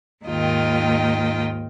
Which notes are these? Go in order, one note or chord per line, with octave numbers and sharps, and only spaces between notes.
D#2 G#2 D#3 F4 D#5 G5